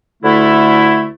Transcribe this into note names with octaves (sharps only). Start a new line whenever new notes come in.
D2 D3 A3 E4